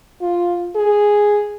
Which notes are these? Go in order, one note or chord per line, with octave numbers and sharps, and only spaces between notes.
F4
G#4